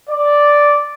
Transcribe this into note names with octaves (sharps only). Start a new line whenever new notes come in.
D5